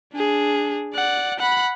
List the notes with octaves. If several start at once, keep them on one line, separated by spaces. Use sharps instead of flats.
D4 G#4
D5 F#5
F#5 B5